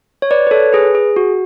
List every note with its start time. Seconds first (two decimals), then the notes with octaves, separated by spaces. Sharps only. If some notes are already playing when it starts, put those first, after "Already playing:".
0.22 C#5
0.31 B4 D5
0.47 B4
0.51 A4 C#5
0.73 G#4 B4
0.95 G#4
1.16 F#4